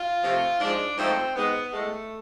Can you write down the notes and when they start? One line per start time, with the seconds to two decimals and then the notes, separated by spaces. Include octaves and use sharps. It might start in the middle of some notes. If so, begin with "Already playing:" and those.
Already playing: F4
0.22 C3 F3 A3
0.60 G#2 F3 G#3 D4
0.97 G#2 F3 A3 C4
1.35 G#2 G#3 B3
1.72 A2 G#3 A3